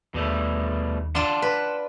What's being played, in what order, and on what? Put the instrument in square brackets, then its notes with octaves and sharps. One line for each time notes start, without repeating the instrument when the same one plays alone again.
[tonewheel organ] D#2 [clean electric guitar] B2 G3 A3
[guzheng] D4 F4 [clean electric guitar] F#5 A5 C6
[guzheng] B4